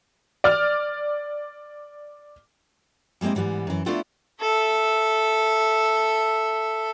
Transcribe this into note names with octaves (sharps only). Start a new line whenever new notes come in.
D5 F6
G3 G#3 A#3 C4 E4
G#2 E3 G3 B3
F#2 E3
A3 B3 D4 E4 F4 A4
A4 E5